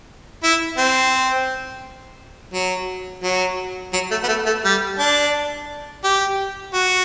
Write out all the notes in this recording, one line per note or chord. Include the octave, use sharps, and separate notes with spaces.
E4
C4
F#3
F#3
F#3
A3
B3
A3
A3
G3
D4
G4
F#4